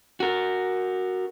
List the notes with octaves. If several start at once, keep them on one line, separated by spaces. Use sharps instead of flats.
F#4 A#4